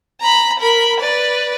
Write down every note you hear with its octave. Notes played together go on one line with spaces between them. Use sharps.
A#5 B5
A#4 B5
B4 D5